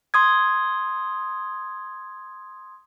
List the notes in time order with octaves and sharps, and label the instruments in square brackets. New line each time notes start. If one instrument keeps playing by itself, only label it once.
[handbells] C6 D#6 G#6